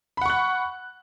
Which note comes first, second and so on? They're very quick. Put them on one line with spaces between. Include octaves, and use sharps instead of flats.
B5 F#5 C#6 F#6